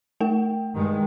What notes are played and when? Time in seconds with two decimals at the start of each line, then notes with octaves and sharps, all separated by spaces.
0.20 A3 A#4 G5
0.74 G2 D#3 G#3